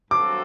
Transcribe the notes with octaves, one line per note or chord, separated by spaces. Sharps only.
G2 F#3 C4 F#4 A4 D6